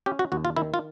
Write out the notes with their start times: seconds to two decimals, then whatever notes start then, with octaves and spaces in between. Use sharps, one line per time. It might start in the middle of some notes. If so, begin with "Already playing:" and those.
0.06 C#4 G4
0.19 F#4
0.32 D#2 F#4
0.45 F4
0.56 D#3 E4
0.74 F4